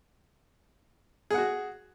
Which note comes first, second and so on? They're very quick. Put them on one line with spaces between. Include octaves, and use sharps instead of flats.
G#4 F#5 F#4